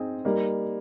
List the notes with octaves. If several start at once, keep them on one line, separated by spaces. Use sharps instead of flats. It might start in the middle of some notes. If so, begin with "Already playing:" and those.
Already playing: C4 D#4 G#4
G3 A#3 D#4